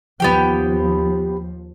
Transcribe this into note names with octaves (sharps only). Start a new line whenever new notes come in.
D#2 F3 B3 G4 G5